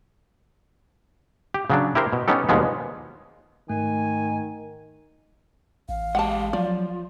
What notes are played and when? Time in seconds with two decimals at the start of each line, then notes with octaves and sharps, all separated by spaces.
1.54 G4
1.70 C#3 F#3 D4
1.95 E4 G4 A#4 C5
2.12 B2
2.28 B3 C#4 D#4 G4 A4
2.49 D#2 B2 F3 G3 G#3 B3
3.70 G#2 D#3 A3 G#5
5.89 A1 F5
6.15 G#3 G4 F#5 A5
6.53 F3 F#3 D5